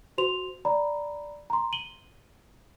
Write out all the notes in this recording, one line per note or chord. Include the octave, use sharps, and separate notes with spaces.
F#4 C5 C6 F7
D5 A#5 B5
A#5 C6
D#7 F#7 G7